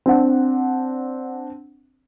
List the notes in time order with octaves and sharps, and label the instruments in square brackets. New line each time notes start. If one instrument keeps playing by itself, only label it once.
[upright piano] C4 D4 F#5